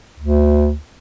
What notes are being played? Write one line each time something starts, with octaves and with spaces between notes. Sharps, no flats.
D2